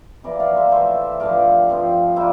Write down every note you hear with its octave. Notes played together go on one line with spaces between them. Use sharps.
C3 E3 A#3 A#4 D5
D5 F5
C5 E5
A2 E3 A3 C5 E5
G2 D3 F3 C4 D5 F5
G2 F3 C4
G3 A#3 C5 E5